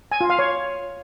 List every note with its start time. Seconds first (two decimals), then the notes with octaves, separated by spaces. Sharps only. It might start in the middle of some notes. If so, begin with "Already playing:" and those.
0.12 G#5
0.21 F4
0.30 F5
0.39 C#5